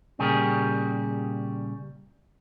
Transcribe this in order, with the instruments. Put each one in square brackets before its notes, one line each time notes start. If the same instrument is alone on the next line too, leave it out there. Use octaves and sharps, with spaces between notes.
[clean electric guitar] A#2 C#3 G3 G4 G#4 A#4